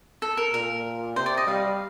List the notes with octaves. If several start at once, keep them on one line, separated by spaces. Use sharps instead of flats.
A4
A#4
A#2 A#4
C3 C5
D5
D#5
G3 F5